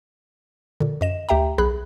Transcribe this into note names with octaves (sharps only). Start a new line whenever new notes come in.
A#2 D3
F#2 D#5 E7
D2 G4 E5 G5 A#5
B1 G#4 B5 F#6